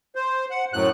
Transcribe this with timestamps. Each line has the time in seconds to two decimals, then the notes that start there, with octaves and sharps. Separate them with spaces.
0.15 C5
0.50 F#5
0.73 F#2 A2 F#6